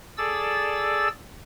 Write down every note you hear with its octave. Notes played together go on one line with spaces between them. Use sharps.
G#4 A4 D5 E6 A6